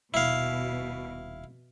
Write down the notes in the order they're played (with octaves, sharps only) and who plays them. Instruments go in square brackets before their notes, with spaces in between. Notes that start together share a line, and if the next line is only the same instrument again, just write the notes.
[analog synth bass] D#1 [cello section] B2 [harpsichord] E4 F5